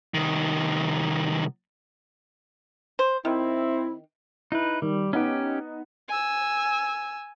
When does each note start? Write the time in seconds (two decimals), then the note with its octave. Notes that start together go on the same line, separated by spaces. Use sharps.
0.14 C2 D#3
2.99 C5
3.25 D#3 C4 E4
4.52 D#4 E4 B4
4.82 D#3 G3
5.13 B3 C#4 D#4 G4
6.10 G#5 E6